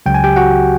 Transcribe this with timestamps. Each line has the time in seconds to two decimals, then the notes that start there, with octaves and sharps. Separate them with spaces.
0.06 C#2 C#3 F#3 G5
0.14 G#5
0.24 G4 G5
0.36 F#4 F#5